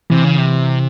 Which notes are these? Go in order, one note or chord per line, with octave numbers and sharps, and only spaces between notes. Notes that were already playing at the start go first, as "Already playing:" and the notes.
C3 E3
C#3
C3